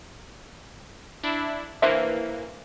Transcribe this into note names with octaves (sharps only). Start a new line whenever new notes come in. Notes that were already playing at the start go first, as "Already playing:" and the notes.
D4 E4
E3 A#3 D4 C5 E5